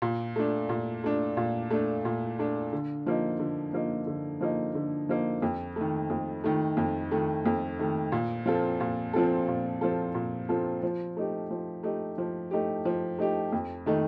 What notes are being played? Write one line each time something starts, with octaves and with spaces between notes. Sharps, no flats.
A#2
A3 D4
A#2
A3 D4
A#2
A3 D4
A#2
A3 D4
D3
F3 A#3 D#4
D3
F3 A#3 D#4
D3
F3 A#3 D#4
D3
F3 A#3 D#4
F2
D#3 A3
F2
D#3 A3
F2
D#3 A3
F2
D#3 A3
A#2
F3 C4 F4 A4
A#2
F3 C4 F4 A4
A#2
F3 C4 F4 A4
A#2
F3 C4 F4 A4
F3
A3 D#4 G4
F3
A3 D#4 G4
F3
A3 D#4 G4
F3
A3 D#4 G4
F2
D#3 A3 D#4